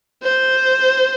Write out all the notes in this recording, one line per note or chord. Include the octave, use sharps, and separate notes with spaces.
C5